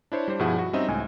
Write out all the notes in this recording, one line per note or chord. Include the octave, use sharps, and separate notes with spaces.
D4 E4 C5 C#5
G3 D4 C5
G2 B2 F3 E4 G#4 F#5
F#4
G3 C4 C#4 D#4 D#5 E5
C#2 A2 G#5